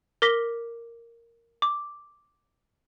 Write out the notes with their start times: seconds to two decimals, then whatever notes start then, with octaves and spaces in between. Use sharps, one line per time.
0.22 A#4 D6 A#6 B6 G7
1.62 D6